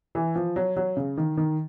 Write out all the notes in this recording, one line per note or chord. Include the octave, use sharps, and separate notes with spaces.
E3
F3
F#3
F#3
C#3
D#3
D#3